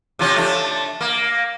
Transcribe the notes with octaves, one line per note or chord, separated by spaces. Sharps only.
C3 F3 C#4
A3 D4
A#3